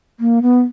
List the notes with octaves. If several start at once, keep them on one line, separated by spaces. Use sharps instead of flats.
A#3
B3